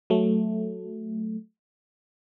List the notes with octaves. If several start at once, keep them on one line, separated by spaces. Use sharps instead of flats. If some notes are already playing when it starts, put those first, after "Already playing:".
F#3 A3